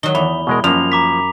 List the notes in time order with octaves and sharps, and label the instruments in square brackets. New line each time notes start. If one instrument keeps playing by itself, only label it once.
[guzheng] D#3 F#3 [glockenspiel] G7
[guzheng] E2 [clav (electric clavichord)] E5 [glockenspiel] B5
[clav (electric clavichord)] B2 G#3 A#4
[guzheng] F#2 [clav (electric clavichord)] F3 A#3 [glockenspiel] F7
[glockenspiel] A#5 D6 B6